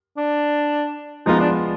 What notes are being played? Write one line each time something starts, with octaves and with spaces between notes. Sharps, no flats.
D4
F3 G#3 B3 D#4 F4
D4